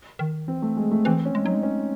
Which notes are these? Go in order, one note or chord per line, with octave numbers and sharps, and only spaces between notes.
D#3
E3 C4
A3
G#3
A3
E3 C4
C#4
G#3
F#3 D#4
G#3
C#4